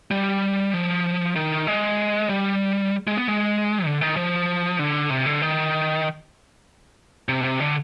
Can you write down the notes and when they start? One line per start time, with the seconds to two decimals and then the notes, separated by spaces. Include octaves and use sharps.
0.11 G3
0.74 F3
1.36 D#3
1.67 G#3
2.30 G3
3.07 G#3
3.17 B3
3.28 G#3
3.85 D3
4.01 D#3
4.17 F3
4.79 D3
5.10 C3
5.26 D3
5.42 D#3
7.29 C3
7.41 B2
7.44 C3
7.60 D3